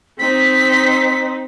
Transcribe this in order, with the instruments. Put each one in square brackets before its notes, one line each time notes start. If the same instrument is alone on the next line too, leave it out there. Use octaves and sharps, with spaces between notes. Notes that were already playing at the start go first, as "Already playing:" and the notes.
[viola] C4 D#4 [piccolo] B6